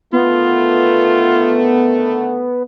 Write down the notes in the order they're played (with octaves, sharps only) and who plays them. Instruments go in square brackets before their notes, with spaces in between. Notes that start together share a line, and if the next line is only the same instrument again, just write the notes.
[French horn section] D3 D#3 A3 [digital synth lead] B3 [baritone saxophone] F4